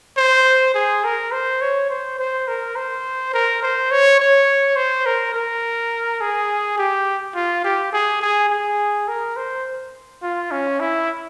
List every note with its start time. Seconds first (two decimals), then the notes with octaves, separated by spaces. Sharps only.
0.17 C5
0.74 G#4
1.04 A#4
1.32 C5
1.62 C#5
1.90 C5
2.19 C5
2.48 A#4
2.76 C5
3.34 A#4
3.63 C5
3.91 C#5
4.20 C#5
4.76 C5
5.06 A#4
5.35 A#4
6.21 G#4
6.78 G4
7.35 F4
7.65 G4
7.93 G#4
8.21 G#4
8.50 G#4
9.08 A#4
9.36 C5
10.22 F4
10.51 C#4
10.80 E4